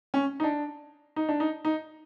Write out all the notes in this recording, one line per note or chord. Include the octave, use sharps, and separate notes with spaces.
C#4
D#4
D4
D#4
D4
D#4
D#4